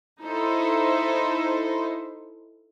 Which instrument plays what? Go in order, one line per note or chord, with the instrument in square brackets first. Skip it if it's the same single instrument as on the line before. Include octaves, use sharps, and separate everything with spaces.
[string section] D#4 E4 A4 C5